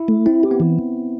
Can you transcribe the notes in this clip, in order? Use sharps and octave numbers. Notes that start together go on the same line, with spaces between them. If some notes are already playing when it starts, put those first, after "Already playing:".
Already playing: E4
A3
C4 E4
G4
B3
E3